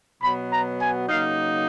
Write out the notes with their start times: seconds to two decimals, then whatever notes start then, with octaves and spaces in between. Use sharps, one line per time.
0.22 B2 F#3 B3 B5
0.51 A#5
0.80 G#5
1.09 C#3 F#3 A#3 D#4 F5